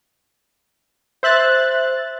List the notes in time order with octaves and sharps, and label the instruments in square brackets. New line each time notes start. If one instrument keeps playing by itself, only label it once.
[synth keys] C5 E5 F#6 A6